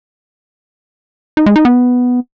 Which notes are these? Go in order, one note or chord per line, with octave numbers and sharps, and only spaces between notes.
D#4
G#3
D#4
B3